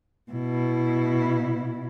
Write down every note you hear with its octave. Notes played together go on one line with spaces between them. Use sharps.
B2 E4